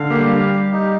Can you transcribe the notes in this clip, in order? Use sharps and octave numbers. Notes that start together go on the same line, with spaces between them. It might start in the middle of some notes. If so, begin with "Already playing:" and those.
Already playing: D3 F5
A#3 G4
G3
F5
G4
D#4